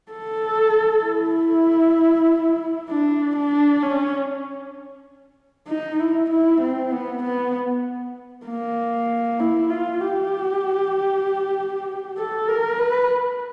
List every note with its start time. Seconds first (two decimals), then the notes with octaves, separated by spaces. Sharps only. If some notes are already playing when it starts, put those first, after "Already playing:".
0.12 A4
1.04 E4
2.90 D4
3.36 D4
3.82 C#4
5.68 D#4
5.99 E4
6.30 E4
6.61 C4
6.92 B3
7.23 B3
8.46 A#3
9.40 E4
9.70 F4
10.01 G4
12.18 A4
12.48 A#4
12.79 B4